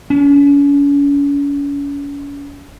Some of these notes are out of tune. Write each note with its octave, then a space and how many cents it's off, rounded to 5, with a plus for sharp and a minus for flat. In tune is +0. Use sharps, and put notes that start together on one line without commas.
C#4 +40